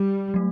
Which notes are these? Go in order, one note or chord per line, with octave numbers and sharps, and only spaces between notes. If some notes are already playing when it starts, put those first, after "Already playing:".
Already playing: G3
F#3 A3